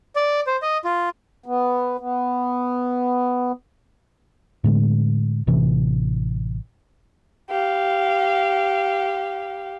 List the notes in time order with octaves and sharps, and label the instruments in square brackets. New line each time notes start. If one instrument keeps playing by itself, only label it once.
[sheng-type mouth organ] D5
C5
D#5
F4
[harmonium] B3
B3
[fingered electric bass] A2 D3 G#3
A1 C3 E3
[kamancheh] G4 F5